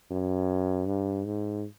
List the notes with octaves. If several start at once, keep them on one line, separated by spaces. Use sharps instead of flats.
F#2
G2
G#2